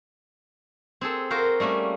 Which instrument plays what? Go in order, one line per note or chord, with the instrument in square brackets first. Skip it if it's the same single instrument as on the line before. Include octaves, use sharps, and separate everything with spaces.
[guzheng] C4 G#4 A4
F4 F#4 A#4 C5
G3 A3 A#3 C#4